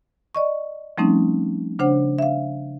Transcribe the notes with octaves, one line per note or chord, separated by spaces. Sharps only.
D5 D#5 C#6
F3 G3 A3 C4 C#4 D#4
C#3 D4 C5 F#5
E5 F5